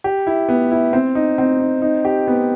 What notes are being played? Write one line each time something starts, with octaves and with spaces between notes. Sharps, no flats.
G4
E4
B3
E4
C4
D#4
C4
D#4
D#4
G4
B3